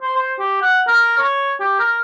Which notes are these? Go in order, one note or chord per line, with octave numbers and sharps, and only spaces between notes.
C5
C5
G4
F#5
A#4
C#5
G4
A#4